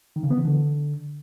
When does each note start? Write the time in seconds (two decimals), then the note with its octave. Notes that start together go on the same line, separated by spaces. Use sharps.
0.16 D#3
0.23 C#3
0.30 B3
0.38 E3
0.45 D3